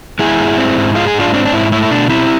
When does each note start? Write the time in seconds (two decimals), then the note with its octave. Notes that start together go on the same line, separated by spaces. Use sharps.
0.19 G#3 E4 G#4
0.39 G#2
0.57 C4
0.77 G#2
0.95 G#3 F4
1.07 G#4
1.14 G#2
1.20 D4 F4
1.34 C4 D4
1.45 D4
1.52 G#2 E4
1.72 A3 E4
1.91 B2 D4
2.09 C4 E4